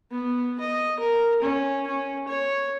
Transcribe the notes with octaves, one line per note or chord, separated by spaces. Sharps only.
B3
D#5
A#4
C#4
C#4
C#5